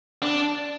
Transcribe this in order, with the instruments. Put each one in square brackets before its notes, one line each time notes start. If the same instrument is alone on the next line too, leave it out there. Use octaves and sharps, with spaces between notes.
[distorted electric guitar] D4